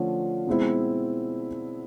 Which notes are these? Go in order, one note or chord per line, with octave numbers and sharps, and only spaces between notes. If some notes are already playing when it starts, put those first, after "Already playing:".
Already playing: D3 F3 A3 C#4 F4
B2 G#3 C4 E4